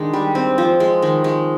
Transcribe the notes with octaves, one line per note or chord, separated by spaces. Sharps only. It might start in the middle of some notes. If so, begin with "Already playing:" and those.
Already playing: D#3 G#3 D4
G3
C4
F3
G#3
D#3
G#3